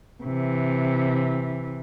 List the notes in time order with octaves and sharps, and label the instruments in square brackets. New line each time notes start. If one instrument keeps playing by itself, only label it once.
[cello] C3 E3